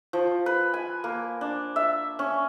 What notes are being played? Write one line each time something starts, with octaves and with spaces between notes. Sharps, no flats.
F3
B4
G#5
A#3
D4
E5
C#4